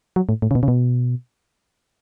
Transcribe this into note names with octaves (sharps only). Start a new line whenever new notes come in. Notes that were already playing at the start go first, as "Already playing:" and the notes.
F#3
A2
A2
C#3
B2
C#3
B2